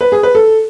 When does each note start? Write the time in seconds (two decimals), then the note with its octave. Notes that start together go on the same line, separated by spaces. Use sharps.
0.01 B4
0.12 G#4
0.23 B4
0.35 A4